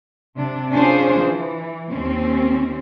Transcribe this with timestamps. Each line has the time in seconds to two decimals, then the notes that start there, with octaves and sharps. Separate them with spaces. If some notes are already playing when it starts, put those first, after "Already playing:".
0.35 C3 D4
0.73 C#4 D4 F4 G#4 C5
1.19 E3
1.91 D#2 C4 C#4